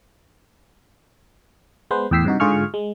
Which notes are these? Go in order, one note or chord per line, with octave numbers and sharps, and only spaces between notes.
G#3 B3 B4 C5
E2 A2 G5 E6 B6 C7
G2 C3 D#4 F#4
G#2 D3 F4 G#4 C#6 F6
G#3